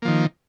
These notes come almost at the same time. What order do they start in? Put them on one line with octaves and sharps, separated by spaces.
A#3 F3 D#3